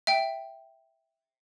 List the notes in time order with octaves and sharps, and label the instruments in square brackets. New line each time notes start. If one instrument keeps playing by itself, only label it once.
[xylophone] E5 G5